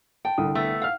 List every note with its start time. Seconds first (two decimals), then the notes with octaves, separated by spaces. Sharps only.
0.25 G5 A5
0.38 C2 D3 D#6
0.55 A3 B3
0.82 F5 F#5 F6